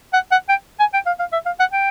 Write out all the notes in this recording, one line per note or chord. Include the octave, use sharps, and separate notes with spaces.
F#5
F#5
G5
G#5
G5
F5
F5
E5
F5
F#5
G5